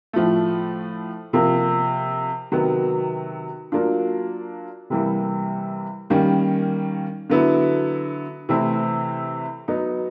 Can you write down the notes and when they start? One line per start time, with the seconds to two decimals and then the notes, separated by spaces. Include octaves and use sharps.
0.13 A2 F3 A3
1.33 C3 F3 A#3
2.52 C3 D#3 F#3 B3
3.72 F#3 A#3 D4 F4
4.90 C3 E3 G3 A#3
6.10 D#3 G3 A#3 C#4
7.30 D3 F#3 B3 E4
8.49 C3 E3 A3 C4 E4
9.68 F#3 B3 D#4